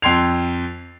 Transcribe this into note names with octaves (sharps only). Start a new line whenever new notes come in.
F2 G5 C6 G#6 C7 F7